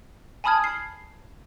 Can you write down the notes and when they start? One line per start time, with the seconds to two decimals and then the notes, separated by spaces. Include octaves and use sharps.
0.44 G#5 A5 B5 D#6 F6 G#6
0.64 C7